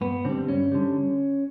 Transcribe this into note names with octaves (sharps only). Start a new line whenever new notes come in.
G2 B3
D3 G3 C4
G2 C#4
D3 G3